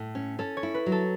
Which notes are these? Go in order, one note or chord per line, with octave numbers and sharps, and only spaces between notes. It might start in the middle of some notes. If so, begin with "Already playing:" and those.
Already playing: A2
C#4
C#4 A4
C#5
E4
B4
F#3
A4